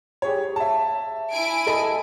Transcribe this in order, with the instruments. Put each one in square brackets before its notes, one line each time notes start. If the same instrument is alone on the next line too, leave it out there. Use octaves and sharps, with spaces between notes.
[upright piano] G4 G#4 C#5
E5 A5
[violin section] E4 G#5 D7
[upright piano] A4 D#5 B5